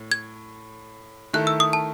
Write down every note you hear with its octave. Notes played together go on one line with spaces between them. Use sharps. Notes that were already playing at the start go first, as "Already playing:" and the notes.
Already playing: A2
G#6
D#3 A3 E4 A4 F#6
E6
D#6
A5